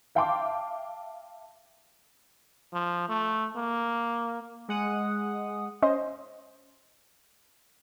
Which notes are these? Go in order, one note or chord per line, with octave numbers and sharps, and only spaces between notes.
E5 F5 G5 A5 C6 D6
F3
A3
A#3
G#3 F#5 D#6
C#4 C5 D#5